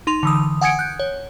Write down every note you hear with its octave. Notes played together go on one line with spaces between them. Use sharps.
D#4 C6 F7
D3 E3 D#6
F#5 G#5 D#6 G#6 C#7 D7
F#6 G6
C#5